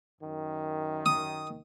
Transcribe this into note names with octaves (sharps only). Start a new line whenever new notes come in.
F#2 D#3
D#6